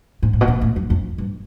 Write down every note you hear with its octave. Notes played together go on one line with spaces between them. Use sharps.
G#2
A2
B2
A#2
A2
F#2
F2
G2